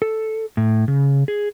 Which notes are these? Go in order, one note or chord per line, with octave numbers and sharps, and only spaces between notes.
A4
A2
C#3
G#4